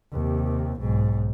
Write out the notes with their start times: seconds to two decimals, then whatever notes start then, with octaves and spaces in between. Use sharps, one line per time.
0.12 D#2 C3
0.80 B1 G#2